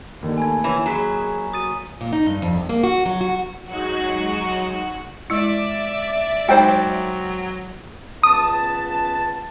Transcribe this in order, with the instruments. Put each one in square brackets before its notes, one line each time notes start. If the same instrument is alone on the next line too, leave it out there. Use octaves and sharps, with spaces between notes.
[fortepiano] D#2 [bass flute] D3
[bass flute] A3 [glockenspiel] G#5 B5 G#6
[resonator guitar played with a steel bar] E3 [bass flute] C#5 [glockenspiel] G#5
[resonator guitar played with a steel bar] F#3 [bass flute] G#4 [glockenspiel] A#5 B6 E7
[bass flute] F#4 [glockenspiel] D#6 A6 D#7
[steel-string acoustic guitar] A#2
D#4
G2
F2
C3
A#3
F#4
F#3
F#4
[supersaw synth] F#3 G#3 D#4 [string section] F#4
[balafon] G#3 E4 [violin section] D5 E5
[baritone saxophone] F#3 [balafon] G#3 D#4 [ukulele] C5 G5
[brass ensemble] C#2 B3 A5 [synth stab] D#6